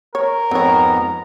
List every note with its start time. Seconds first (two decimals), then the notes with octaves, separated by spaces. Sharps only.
0.15 A#4 C#5
0.51 F2 G#2 B3 C4 C#5 A#5